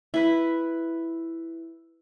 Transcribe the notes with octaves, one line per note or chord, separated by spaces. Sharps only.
E4 B4 B5